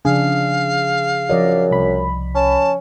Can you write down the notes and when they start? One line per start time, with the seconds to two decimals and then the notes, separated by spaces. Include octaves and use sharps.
0.05 C#3 F3 D4 G#4 F5
1.30 F#2 F3 D5 D#5
1.71 C2 B5
2.35 C#4 A5